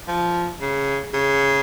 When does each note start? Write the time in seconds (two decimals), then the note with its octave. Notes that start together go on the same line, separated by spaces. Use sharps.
0.08 F3
0.61 C#3
1.14 C#3